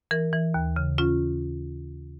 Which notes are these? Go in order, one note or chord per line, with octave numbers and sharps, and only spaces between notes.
E3 A#4
E3
D#2
C#3
C#4 F4